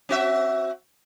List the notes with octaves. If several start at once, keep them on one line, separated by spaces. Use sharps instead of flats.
C4 F#4 E5